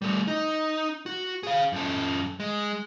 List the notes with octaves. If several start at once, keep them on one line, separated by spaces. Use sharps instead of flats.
G3 A3
D#4
F#4
G#4 F5
F#2 A4
G#3